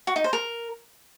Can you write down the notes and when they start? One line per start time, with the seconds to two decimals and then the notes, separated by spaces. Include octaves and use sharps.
0.07 F#4
0.16 D#4
0.24 C5
0.33 A#4